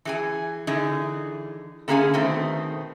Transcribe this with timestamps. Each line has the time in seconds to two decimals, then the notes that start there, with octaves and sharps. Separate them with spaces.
0.05 E3 G#4 G#5
0.67 D3 E3 D#4 G#4
1.88 D3 A#3 C#4 G#4 F5 G#5
2.14 B2 D#3 A3 C4